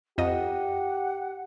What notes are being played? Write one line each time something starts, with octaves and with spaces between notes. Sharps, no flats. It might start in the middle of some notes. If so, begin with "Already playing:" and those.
F2 G4 D#5 F#5